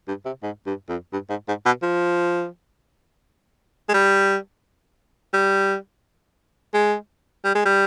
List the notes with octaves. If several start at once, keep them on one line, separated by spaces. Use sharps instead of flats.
G2
C3
G#2
G2
F2
G2
G#2
G#2
B2
F3
G#3
G3
G3
G#3
G3
G#3
G3